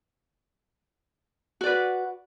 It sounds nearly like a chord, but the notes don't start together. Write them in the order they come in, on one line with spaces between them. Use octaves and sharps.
F#4 D5 B4